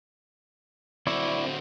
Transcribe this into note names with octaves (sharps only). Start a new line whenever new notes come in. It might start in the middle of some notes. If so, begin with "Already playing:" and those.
D2 C4 E4 D5 C#6